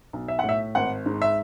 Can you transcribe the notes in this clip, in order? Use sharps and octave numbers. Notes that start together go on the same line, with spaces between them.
B1
E5
A2 F#5
E5
G#1 F#5
G#2
E5